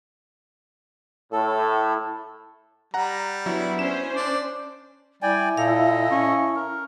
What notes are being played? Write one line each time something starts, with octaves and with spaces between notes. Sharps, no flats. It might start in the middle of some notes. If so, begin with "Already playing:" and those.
A2 A4
G3 F#5 A#5
F#3 B3 D4 E4
C#4 C5 E7
D4 D5
G3 E4 D5 G5 G#5
A#2 A4 D#5 F5
C#4
A#4